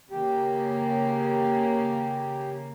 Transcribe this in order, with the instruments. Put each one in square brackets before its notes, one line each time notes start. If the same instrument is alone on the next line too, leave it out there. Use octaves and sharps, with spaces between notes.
[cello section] C#3 A#3 [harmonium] G4